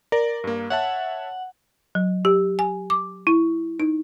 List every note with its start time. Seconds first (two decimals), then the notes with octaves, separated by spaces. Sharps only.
0.12 A#4 D5
0.44 G2 A#3
0.70 C#5 E5 F#5 A5
1.95 F#3
2.25 G4
2.59 G#5
2.90 D6
3.27 E4
3.80 D#4